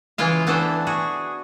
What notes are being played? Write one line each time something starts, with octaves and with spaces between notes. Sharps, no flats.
C#3 E3 G#3 E4 F4 F5
E3 A3 B3 D4 A4 C5
F#4 G#4